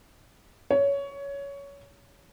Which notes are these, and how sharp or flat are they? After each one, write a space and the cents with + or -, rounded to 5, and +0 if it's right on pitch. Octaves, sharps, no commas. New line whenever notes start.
C#5 +15